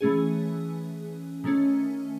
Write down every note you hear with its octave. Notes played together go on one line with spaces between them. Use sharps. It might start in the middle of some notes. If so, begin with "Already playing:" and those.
E3 A3 C#4 G#4
D#3 A3 C#4